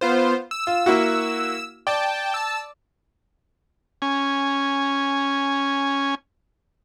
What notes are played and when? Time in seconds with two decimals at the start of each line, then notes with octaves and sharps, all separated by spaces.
0.01 B3 F4 C5
0.51 E6
0.67 F4
0.86 A#3 E4 F#4
1.87 D5 G5 A5
2.34 A5 E6
4.02 C#4 G#5